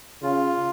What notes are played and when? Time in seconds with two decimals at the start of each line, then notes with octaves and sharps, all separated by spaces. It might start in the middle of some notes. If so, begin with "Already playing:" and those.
0.22 C#3 F4